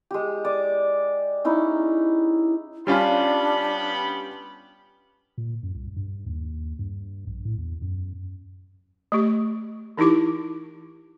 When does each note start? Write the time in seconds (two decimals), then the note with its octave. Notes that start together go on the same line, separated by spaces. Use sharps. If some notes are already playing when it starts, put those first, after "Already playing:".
0.11 G#3 G4
0.45 D5 D#6
1.45 C#4 D#4 E4
2.87 G3 B3 C#4 D4 F4 G4 B5
5.38 A#2
5.63 F#2
5.75 C2
5.96 G2
6.26 D#2
6.79 G2
7.27 A#1
7.45 A2
7.58 E2
7.82 F#2
9.12 A3 G4
9.98 E3 D#4 E4 G4 D6